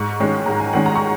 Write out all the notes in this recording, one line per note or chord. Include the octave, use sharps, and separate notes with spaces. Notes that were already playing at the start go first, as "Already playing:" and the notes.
Already playing: G#2 C#6
D#3 G#3 C#4
G#2 A#5
G#5
D#3 G#3 C#4 F#5
A#5
C#6